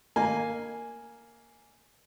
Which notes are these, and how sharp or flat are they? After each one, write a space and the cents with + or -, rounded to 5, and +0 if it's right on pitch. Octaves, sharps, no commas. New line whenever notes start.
A#3 -5 D#5 -25 G#5 +0